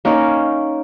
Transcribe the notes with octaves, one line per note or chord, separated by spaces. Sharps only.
A#3 C#4 D#4 C#5